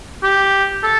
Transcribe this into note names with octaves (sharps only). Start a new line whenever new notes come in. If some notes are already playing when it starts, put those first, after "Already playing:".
G4
A4